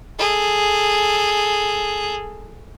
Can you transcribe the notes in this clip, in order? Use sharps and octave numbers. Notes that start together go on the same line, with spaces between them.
G#4 A4